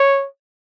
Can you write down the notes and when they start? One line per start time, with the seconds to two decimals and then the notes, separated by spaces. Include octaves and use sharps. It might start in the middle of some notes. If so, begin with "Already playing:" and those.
Already playing: C#5